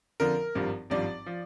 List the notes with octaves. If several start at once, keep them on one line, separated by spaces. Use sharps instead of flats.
F2 D3 F3 A#4
G#1 G2 F3
G#1 G2 F3 D5
F3